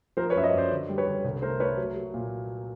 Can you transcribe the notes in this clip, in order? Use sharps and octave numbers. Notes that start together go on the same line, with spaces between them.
F3 A#4 C5
B4 C#5
F#2 E5
C#5 D#5
F#2 C5 D5
D3
G3
B4 C#5
D3
C2
A3 A#4 C5
A3 B4 C#5
F#3
F#3
A#2